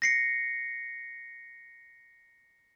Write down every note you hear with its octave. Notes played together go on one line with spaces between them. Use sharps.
A#6 C7 C#7